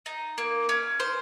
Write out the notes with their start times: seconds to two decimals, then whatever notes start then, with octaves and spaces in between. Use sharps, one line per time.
0.06 D#4
0.38 A#3
0.69 C#4
1.00 C5